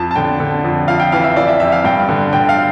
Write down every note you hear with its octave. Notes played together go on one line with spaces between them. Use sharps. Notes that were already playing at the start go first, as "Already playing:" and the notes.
Already playing: F2 A5
A5
D3 G5
D3
F2
F2 F5
G5
E3 F5
E5
E3 D5
E5
F2 E5
F5
G2 G5
D3
D3 G5
F5